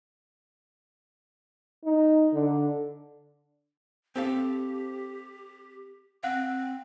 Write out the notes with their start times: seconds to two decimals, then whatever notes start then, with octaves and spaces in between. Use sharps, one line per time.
1.84 D#4
2.33 D3
4.16 C4 G4 A4 F5
6.23 C4 F5 F#5 F#6